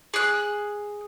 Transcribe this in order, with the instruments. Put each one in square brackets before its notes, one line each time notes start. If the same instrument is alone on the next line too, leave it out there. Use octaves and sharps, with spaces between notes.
[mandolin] G#4 F#6